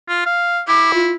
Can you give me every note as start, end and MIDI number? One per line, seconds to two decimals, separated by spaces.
0.09 0.25 65
0.26 0.61 77
0.68 1.14 64
0.68 0.91 86
0.94 1.13 65